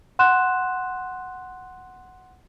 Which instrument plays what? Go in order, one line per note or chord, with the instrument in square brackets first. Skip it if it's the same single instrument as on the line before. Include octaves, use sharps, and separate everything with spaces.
[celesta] F#5 C6 F#6 E7